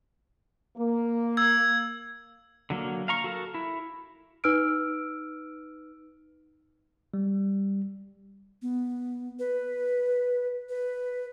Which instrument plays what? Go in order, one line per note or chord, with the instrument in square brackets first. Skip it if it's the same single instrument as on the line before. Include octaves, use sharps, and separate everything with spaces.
[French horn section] A#3
[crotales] E6 G#6
[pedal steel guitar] D3 F#3 A#3
F5 A#5 C#6
F#4 A4 A#4
E4
[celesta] D#4 B4 E6 F6 D7
[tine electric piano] G3
[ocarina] B3
B4
B4